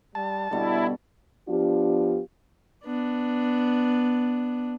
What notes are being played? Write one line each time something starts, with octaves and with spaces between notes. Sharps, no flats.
G3 A5
B2 D3 G3 E4
F3 B3 D4 F4 G4
B3 D4